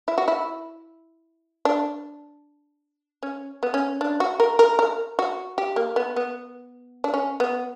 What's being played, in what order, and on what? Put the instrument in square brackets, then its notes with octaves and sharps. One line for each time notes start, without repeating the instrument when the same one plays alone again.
[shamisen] E4
F#4
E4
D4
C#4
B3
C#4
D4
F#4
A#4
A#4
A#4
F#4
G4
A#3
B3
B3
D4
C#4
B3